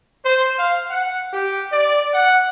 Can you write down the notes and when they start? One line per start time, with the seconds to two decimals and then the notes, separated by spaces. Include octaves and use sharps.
0.24 C5
0.58 F5
0.90 F#5
1.33 G4
1.71 D5
2.13 F#5